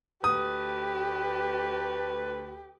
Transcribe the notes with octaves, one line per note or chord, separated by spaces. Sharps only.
D2 A3 G4 B4 D#6